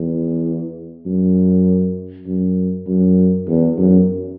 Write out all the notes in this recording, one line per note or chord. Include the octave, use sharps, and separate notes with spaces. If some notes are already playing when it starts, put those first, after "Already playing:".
Already playing: E2
F#2
F#2
F#2
E2
F#2